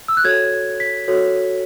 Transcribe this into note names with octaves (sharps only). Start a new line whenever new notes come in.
E6
F#6
F#4 A4 C#5 G#6
B6
F#4 A4 C#5